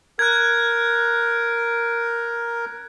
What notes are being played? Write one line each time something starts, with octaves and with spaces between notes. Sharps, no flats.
A#4 F#6 G#6